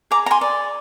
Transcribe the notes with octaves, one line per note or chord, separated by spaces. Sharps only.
G#4 A#5 D6
A#5
G#5 C6
D5